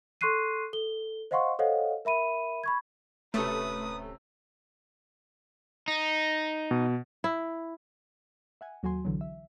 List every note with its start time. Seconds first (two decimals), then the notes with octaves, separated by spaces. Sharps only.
0.21 A4 C6 C#6 F#6 C7 D#7
0.73 A4 G7
1.31 C5 D#5 F5 F#5 C6 C#6
1.59 A4 C5 C#5 D#5 F5 F#5
2.05 A#4 E5 B5 D#7
2.64 B5 C#6 G#6
3.34 D1 C3 A3 C#4 B4 D#6
5.88 D#4
6.71 B2
7.24 E4
8.61 E5 F#5 G#5
8.83 D#2 F#3 F#4 A4 G#5 C6
9.05 B1 D3 E3 F#3
9.21 E5